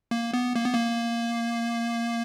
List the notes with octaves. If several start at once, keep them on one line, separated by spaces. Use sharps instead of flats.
A#3
B3
A#3
B3
A#3